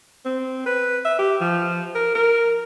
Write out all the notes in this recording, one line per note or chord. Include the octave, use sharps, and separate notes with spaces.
C4
B4
E5
G4
F3
A#4
A#4